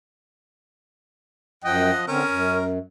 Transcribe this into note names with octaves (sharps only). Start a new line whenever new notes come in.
F#2 F3 D#5 F#5 G5
D3 C4 C#4 A#4
F#2